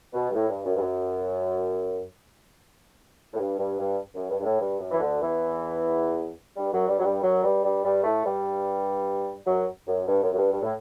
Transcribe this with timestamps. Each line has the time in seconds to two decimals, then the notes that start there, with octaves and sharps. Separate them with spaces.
0.14 B2
0.30 G2
0.34 A2
0.49 G2
0.65 F#2
0.75 G2
0.79 F#2
3.34 A2
3.38 G2
3.58 G2
3.78 G2
4.14 F#2
4.29 G2
4.40 G2
4.44 A2
4.59 G2
4.79 F#2
4.91 E3
4.99 D2 D3
5.20 E2 E3
6.57 G2 G3
6.72 F#2 F#3
6.87 G2 G3
6.98 F#3
7.03 G2 G3
7.22 F#2 F#3
7.43 G2 G3
7.63 G2 G3
7.84 G2 G3
8.04 A2 A3
8.24 G2 G3
9.45 F#2 F#3
9.86 F#2
10.06 G2
10.22 F#2
10.32 F#2
10.37 G2
10.52 G2
10.61 A2